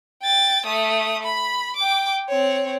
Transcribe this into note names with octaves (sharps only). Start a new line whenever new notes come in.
G5 A6
A3 D#6
B5
G5 D6
C4 C#5